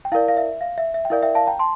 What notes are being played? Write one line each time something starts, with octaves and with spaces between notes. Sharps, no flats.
G5
E4 A#4 D5 F5
F5
E5
F5
E5
E5
G5
E4 A#4 D5 F5
E5 G5
F5 A5
G5 A#5
A5 C6